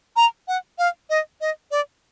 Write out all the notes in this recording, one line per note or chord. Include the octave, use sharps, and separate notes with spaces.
A#5
F#5
F5
D#5
D#5
D5